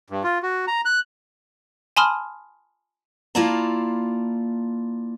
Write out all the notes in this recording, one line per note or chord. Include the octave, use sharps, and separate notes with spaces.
G2
F4
F#4
A#5
F#6
G#5 A5 B5 C6 D#6 F6
A#3 E4 F4 D5 A5 A#5